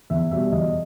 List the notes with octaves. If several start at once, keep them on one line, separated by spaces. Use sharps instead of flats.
E2 E5
B2 G3 E5
E2 D#5